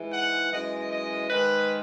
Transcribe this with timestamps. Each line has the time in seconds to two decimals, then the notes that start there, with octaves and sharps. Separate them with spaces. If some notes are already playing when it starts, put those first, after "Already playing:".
Already playing: G#2 E3 G#3
0.13 F#5
0.51 F#2 E3 G#3 D#5
0.90 D#5
1.29 G#2 D#3 G#3 B4